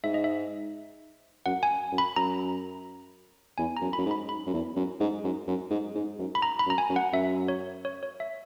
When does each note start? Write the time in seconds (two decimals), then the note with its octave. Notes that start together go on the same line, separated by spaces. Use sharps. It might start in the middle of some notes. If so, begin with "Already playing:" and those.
0.04 G#2 E5
0.14 D#5
0.24 E5
1.46 F#2 F#5
1.63 G#5
1.92 F#2
1.98 B5
2.16 F#2 A#5
3.58 E2 G#5
3.77 F#2 A#5
3.93 B5
3.98 F#2
4.06 G#2
4.11 B5
4.29 B5
4.46 F#2
4.53 E2
4.76 F#2
5.00 G#2
5.24 F#2
5.47 F#2
5.71 G#2
5.95 G#2
6.19 F#2
6.35 B5
6.42 A#5
6.59 B5
6.66 F#2
6.70 A#5
6.78 G#5
6.90 F#2
6.96 F#5
7.13 F#2 E5
7.48 C#5
7.85 C#5
8.03 C#5
8.20 E5